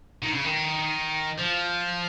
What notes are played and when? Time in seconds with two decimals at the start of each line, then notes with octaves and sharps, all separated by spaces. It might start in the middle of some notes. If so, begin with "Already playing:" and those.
0.22 D#3
0.33 C#3
0.44 D#3
1.39 F3